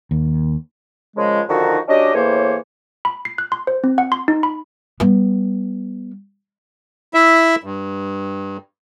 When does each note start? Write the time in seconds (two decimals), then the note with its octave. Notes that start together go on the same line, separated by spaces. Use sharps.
0.11 D#2
1.17 A#2 C#3 F3 G#3
1.49 D3 D#3 F3 D#4 F#4
1.88 F#3 C#4 D4 G4 D#5
2.14 E2 A2 E3 A#3 C5 C#5
3.05 B5
3.25 C7
3.38 F#6
3.52 C6
3.67 C5
3.84 C4
3.98 F#5
4.12 C6
4.28 D#4
4.43 B5
5.00 G3 B3
7.14 E4 E5
7.63 G2